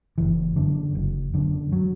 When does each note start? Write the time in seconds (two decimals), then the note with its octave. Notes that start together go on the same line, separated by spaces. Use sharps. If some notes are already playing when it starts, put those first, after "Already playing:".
0.18 F#1 E3
0.56 F#2 D3
0.95 F#1
1.34 F#2 D3
1.72 F#3